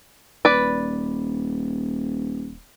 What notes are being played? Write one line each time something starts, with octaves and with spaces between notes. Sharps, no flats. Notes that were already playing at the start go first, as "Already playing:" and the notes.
D#1 B4 D5